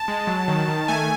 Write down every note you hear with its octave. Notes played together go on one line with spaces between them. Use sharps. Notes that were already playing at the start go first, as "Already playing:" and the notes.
Already playing: A5
G#3
F#3
D#3
D#3
A3 G#5